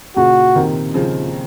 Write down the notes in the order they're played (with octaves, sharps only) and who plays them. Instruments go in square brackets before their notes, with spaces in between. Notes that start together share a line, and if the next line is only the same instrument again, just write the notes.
[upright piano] A#2 C#3 [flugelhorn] F#4
[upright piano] C3 D#3
C#3 F3